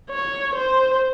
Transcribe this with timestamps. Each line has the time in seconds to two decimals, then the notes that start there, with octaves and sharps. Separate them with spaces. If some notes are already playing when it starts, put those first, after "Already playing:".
0.11 C#5
0.55 C5